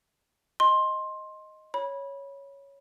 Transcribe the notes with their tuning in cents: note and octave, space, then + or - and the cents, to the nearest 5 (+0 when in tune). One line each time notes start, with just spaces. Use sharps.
D#5 +0 C6 +15
C#5 +0 B5 -20